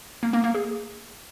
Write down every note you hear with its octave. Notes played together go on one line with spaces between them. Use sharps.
A#3
A#3
A#3
G#4